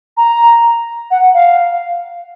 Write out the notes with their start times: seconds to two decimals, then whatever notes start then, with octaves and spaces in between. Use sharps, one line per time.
0.17 A#5
1.11 F#5
1.34 F5